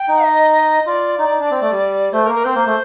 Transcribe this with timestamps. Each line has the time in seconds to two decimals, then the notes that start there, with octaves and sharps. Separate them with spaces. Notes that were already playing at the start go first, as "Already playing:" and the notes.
Already playing: G5
0.08 D#4
0.25 D#5
0.87 F4 D5
1.18 D#4
1.29 D#4
1.39 D4
1.51 C4
1.61 A3
1.71 G3
2.13 A3 C5
2.25 A#4
2.29 A#3
2.35 A#4
2.44 C4 C5
2.55 A#3
2.66 A3